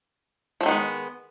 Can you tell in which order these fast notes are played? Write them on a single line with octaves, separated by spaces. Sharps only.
F3 A3 D#3 B3 G#3